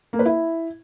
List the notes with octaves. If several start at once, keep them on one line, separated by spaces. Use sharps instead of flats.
A#3
B4
E4